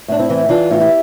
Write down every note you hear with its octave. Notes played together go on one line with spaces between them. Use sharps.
A2 D4
C4 E4
E3
E3 D4 F4
A2 F4
E4 G4